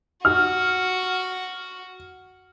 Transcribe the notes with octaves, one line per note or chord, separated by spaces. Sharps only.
F#4 F6